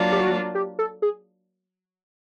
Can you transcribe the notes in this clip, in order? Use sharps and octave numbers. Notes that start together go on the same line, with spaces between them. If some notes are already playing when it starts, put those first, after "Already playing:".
Already playing: F#3 A#3 D4 F4
G4
F#4
G4
A4
G#4